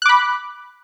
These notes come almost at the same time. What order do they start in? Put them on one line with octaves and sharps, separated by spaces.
F#6 D6 B5